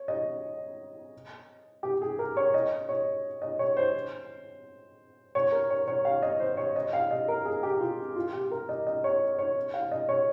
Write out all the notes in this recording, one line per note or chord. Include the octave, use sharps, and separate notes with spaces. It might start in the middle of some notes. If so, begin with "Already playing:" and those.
Already playing: C#5
D#5
G4
G#4
A#4
C#5
D#5
C#5
D#5
C#5
C5
C#5
A#4
C#5
C#5
F5
D#5
C5
C#5
D#5
F5
D#5
A#4
G#4
G4
F4
F4
G4
A#4
D#5
D#5
C#5
C#5
F5
D#5
C#5